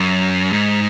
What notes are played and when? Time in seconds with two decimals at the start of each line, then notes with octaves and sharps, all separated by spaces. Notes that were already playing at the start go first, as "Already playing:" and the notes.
Already playing: F#2
0.53 G#2